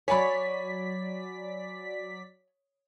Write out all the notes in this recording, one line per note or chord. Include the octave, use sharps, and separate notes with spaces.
F#3 C#5 D5 G#5 B5 B6